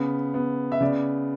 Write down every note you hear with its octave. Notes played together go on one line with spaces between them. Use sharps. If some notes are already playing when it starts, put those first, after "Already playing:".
Already playing: C#3 B3
B3
E5
C#3 D5